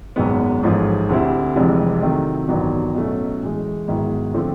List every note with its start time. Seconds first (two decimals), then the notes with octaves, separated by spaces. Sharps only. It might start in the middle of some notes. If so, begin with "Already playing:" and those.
0.16 G#1 F#2 D#3 G#3 B3
0.63 A1 G#2 F3 A3
1.09 D2 D3 G3 C4 E4
1.56 F1 F2 C3 E3 G#3
2.02 C3 D#3 F#3 A3
2.48 A1 G2 D#3 F#3 B3
2.95 B2 F#3 A3 C#4
3.42 A2 E3 G#3
3.88 G#2 D#3 F#3 B3 E4
4.34 D3 F3 A3 C4